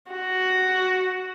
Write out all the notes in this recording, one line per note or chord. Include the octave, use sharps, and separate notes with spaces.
F#4